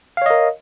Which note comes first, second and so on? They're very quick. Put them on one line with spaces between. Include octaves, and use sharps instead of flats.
F5 C#5 D#5 A#4